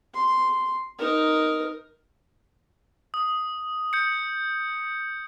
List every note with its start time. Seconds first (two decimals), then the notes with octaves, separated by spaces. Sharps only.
0.14 C6
0.98 D#4 A#4
3.14 D#6
3.93 G6 C#7